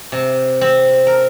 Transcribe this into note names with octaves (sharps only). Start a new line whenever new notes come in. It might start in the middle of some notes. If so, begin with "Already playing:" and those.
C3
C4
A#4